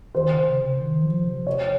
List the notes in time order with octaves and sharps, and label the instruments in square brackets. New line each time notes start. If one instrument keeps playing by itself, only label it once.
[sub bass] D#3 [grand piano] C5
[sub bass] C#3
C3
C#3
C#3
D#3
F3
C3
[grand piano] C#5